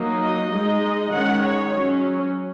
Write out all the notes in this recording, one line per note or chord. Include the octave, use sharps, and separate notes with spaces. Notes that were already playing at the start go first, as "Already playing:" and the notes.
Already playing: F#3 A#3 D#4
D#5
G#3 D#4 D#5
D#3 G#3 C#4 F#5
C#5
F#3 C#4